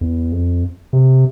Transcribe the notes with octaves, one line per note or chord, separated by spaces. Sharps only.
E2
F2
C3